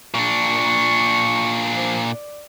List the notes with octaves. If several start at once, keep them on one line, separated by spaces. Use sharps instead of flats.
A#2 D4 C#6
F3
D5